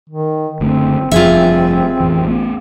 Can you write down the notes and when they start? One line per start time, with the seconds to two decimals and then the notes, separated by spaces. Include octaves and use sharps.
0.09 D#3
0.60 F#1 D3 A3 C4
1.11 F1 G2 F3 F4 G#4 E5
2.00 A1 F2 E3
2.27 A3 B3